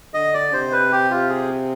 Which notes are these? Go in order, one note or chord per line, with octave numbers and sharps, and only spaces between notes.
D3 D#5
D5
C3 C5
B4
G4
F4
G#4